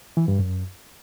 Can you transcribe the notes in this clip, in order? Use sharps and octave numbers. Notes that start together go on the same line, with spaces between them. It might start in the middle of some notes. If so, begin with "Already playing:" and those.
E3
G2
F#2